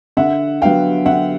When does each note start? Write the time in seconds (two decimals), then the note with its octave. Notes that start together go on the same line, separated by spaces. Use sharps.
0.17 D3 E5 F#5
0.61 F#3 B3 D4 F5 G5
1.05 D3 E5 F#5